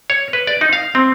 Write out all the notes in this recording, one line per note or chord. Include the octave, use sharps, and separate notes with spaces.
C#5
B4
D5
D#4
F5
C4